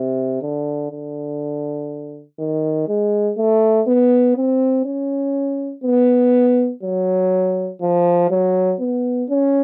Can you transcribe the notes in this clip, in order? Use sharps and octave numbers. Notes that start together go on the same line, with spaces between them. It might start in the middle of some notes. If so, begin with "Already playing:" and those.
Already playing: C3
D3
D3
D#3
G#3
A3
B3
C4
C#4
B3
F#3
F3
F#3
B3
C#4